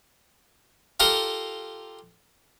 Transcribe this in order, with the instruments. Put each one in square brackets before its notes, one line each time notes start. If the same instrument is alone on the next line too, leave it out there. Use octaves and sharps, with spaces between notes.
[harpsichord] F4 G4 A4 A#4 F5